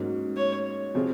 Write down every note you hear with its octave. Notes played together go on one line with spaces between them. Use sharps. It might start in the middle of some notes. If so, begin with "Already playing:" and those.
Already playing: G#2 F#3 A#3 C#4
C#5
C3 F3 C4 F4 G#4